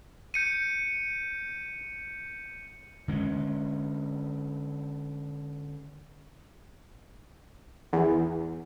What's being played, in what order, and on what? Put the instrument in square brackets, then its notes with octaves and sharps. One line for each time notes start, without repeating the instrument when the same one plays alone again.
[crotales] G6 C#7 D#7
[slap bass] D3 G#3 B3 C#4
[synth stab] E2